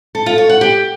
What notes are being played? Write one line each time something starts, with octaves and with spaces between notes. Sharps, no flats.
A4
F4
C#5
F#5
G4